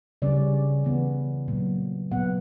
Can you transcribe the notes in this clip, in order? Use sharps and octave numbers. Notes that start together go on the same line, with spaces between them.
C#3 G3 C#4 D5
E3 B3
A#2 F#3 A#3
A#2 F#3 B3 F#5